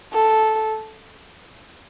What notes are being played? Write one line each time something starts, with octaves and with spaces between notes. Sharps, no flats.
A4